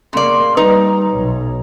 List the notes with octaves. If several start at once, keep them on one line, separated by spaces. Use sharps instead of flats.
C#3 A#3 D5 C6
G3 D#4 B4 A#5
B1 C#5